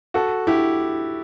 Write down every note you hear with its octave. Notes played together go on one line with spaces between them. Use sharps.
F#4 A4
E4 G4